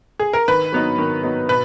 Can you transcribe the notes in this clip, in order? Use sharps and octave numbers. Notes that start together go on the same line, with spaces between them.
G#4
A#4
D#3 B4
F#3 B3 D#4
D#3
F#3 B3 D#4
B2 B4